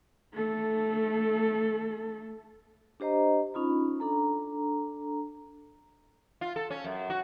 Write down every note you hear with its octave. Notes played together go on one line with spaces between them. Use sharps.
A3 A4
D4 G4 C5 D#5 A#5
C#4 D#4 F4 B5
D4 A4 A#5
F4
A4
C#4
F#2
F#4